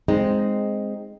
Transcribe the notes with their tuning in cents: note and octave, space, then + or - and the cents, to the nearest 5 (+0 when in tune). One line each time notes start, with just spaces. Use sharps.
G#3 +0 C4 +0 D#4 +0